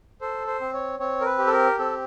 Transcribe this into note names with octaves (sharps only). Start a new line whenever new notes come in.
A4 C5
C5
C4
C#5
C4 C#5
A#4
B4
G4
A4
A#4
C4 A4